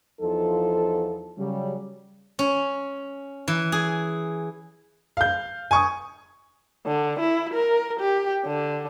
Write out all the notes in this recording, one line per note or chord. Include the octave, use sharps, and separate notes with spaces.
E2 F3 D#4 F4 A4
C#3 F#3 G3
C#4
E3
G#4
F5 G6
G#5 C#6 D#6
D3
E4
A#4
G4
D3